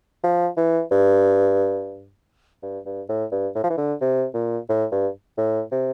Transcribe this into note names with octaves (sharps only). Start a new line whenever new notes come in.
F3
E3
G2
G2
G2
A2
G2
A2
F3
E3
D3
C3
A#2
A2
G2
A2
C3